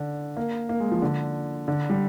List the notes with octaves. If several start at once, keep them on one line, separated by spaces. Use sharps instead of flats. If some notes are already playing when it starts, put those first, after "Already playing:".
Already playing: D3
A#3
A#3
G#3
F3
D3
D3
G3